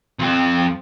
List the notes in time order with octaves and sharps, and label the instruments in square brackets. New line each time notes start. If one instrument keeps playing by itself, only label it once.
[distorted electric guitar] F2 C4